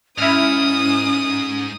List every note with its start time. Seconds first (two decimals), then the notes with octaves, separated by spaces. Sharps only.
0.18 G#2 C#4 E4 D#6 F6